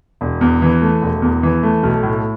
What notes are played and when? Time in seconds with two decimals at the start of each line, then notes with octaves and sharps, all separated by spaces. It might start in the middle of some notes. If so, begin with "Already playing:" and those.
0.21 E1
0.41 E2
0.62 E3
0.82 A3
1.02 E1
1.22 E2
1.43 E3
1.63 A3
1.83 B1
2.03 A2